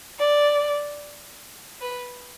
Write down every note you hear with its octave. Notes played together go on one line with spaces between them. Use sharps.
D5
B4